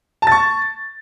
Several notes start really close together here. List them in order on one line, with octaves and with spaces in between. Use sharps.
A5 A6 C#6